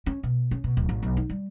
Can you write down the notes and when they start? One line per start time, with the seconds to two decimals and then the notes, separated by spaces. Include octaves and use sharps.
0.06 C#4
0.23 B2
0.51 C#4
0.64 B2
0.77 D1
0.89 A1
1.03 B1
1.17 D#4
1.29 G3